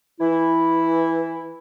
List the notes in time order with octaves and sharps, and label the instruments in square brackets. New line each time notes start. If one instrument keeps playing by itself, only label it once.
[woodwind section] E3 E4